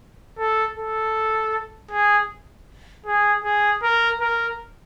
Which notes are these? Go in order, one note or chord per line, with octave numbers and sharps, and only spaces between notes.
A4
A4
G#4
G#4
G#4
A#4
A#4